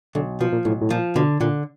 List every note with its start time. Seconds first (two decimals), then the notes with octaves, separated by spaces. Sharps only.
0.15 B1 D3
0.41 B2 F3
0.53 A#2
0.65 B1 A2
0.81 A2
0.90 A#2 F3
1.15 B2 D3
1.40 A#2 D3